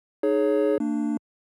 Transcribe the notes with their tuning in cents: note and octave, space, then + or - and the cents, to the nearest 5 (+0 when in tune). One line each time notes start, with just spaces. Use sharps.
D#4 -20 G#4 +20 C#5 +0
A#3 -40 D4 +10